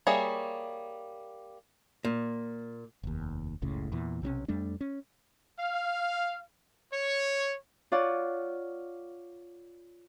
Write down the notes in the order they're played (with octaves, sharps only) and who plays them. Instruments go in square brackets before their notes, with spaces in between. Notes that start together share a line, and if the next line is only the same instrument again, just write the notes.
[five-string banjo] G3 A#3 G#4 C#5 E5
[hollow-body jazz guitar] A#2
[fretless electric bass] F1 D#2
F#1 C#2 A2 C#3
E2 A#2 E3
B1 C3 C4 C#4
F2 G3 A3 D4
C#4
[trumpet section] F5
C#5
[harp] F4 C#5 D5 F#5